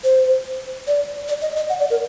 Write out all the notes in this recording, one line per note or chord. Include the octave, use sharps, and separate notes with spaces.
C5
D5
D5
D#5
D#5
F#5
D5
A#4